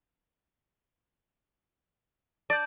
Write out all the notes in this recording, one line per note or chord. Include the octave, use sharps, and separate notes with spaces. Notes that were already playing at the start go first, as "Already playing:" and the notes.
D5 A5 G6